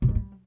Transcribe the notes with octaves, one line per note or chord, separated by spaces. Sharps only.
A#2
G#2
G3